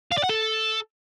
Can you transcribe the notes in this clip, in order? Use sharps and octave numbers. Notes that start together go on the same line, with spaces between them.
F5
D5
F#5
A4